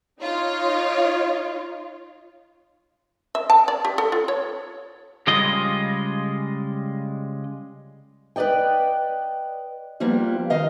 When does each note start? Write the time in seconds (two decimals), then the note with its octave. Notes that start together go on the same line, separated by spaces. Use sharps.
0.21 D#4 F4 C#5
3.35 E5
3.50 A5
3.68 D5
3.85 G4
3.98 A4
4.12 F4
4.28 C#5
5.27 C#3 G3 G#3 F4 D#5
8.36 B4 C5 D5 D#5 G5
10.00 F3 G3 A#3 B3 F4
10.50 D#3 D#5 F5